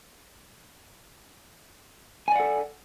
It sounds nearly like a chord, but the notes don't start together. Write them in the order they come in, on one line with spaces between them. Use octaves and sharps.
G#5 D5 F#5 A4